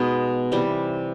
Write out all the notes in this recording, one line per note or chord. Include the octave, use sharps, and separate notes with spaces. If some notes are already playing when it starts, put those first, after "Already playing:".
Already playing: B2 G#3 B3 D#4
C3 E3 G3